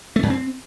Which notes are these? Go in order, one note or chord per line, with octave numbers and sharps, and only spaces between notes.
A3
F#2
C4